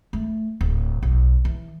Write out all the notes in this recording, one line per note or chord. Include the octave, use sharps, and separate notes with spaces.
A3
D1
B1
E3